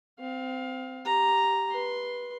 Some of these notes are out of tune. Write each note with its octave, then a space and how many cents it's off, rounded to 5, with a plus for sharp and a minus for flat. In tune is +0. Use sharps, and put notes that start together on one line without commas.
C4 -20 F5 +20
G4 +0 A#5 +0
B4 -20 C6 +0